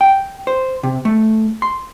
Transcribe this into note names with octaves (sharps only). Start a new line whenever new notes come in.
G5
C5
C3
A3
C6